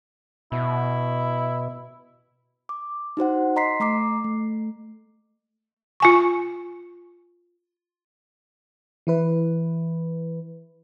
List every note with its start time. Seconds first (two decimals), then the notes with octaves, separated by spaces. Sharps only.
0.52 B2 E4
2.69 D6
3.17 D#4 F#4 C5 F#5
3.56 D#5 A#5 C6 B6 C7
3.80 A3 A#5 D6 C7
4.24 A3
6.00 F4 G#5 C#6
9.07 E3 E4 B4